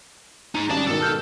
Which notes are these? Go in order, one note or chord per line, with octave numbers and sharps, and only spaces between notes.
D#4 G#4
G#1 G3 C#4 D5 A5
G#2 B2 D#3 A4
A5 F6 G6